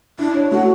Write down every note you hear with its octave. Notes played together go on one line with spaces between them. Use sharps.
D4 E4
C#5
A3 F#4